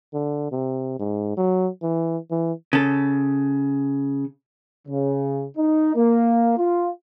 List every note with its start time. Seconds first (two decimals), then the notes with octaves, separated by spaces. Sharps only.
0.14 D3
0.52 C3
0.99 G#2
1.37 F#3
1.83 E3
2.31 E3
2.73 C#3 A4
4.88 C#3
5.57 D#4
5.95 A#3
6.58 F4